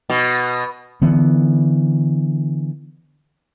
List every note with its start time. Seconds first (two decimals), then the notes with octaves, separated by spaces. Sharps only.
0.10 B2
1.02 D3 E3 B3